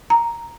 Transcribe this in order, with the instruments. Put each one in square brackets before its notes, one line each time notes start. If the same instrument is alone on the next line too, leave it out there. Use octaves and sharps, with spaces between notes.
[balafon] A#5